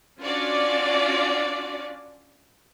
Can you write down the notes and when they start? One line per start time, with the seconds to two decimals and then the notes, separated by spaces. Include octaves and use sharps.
0.21 C#4 D4 F4 F#4 D5